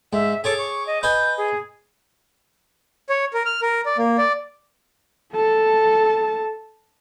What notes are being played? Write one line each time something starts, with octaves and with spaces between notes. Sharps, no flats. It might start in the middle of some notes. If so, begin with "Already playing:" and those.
G#2 E5
G#4 A4 C#5 D6
C#6
D#5
B4 D#5 G#5 G6
G#4
C#5
A#4
F6
A#4
D5
A#3
D5
A4 A5